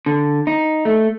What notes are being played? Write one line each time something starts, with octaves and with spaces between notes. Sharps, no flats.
D3
D#4
A3